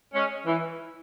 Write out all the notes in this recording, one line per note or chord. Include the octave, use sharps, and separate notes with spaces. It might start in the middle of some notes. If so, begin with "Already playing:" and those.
G#3 C#4
E3